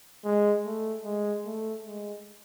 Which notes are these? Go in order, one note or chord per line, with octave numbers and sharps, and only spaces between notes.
G#3
A3
G#3
A3
G#3